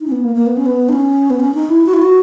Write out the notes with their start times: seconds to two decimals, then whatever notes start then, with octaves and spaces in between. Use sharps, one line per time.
0.01 D#4
0.07 C#4
0.12 B3
0.24 A#3
0.35 A#3
0.46 B3
0.57 C#4
0.66 B3
0.89 D#4
0.93 C#4
1.30 B3
1.40 C#4
1.55 D#4
1.70 E4
1.86 F#4
1.94 E4
2.02 F#4